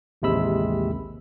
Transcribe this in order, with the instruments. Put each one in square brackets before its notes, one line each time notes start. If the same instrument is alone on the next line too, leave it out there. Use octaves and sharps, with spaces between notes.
[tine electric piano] A1 D#2 C3 G#3 B5 E6